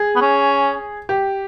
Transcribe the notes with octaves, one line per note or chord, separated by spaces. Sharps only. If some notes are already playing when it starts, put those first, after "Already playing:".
Already playing: G#4
B3
C#4
G4